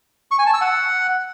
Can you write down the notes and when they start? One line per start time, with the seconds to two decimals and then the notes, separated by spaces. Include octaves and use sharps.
0.31 C#6
0.39 G#5
0.46 A5
0.54 E6
0.61 F#5